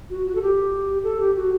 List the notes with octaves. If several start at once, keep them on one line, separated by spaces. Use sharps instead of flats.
F#4
F#4
A4
G4
A4
G4
F#4